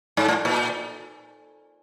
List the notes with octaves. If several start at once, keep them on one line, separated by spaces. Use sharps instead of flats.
G#2
A2
A#2